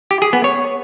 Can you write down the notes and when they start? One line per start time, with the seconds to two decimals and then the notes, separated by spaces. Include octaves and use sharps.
0.11 G4
0.22 G#4
0.33 B3
0.44 C#5